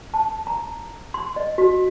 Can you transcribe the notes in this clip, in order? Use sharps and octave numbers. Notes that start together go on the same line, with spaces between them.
A5
A#5
C6
D#5
F#4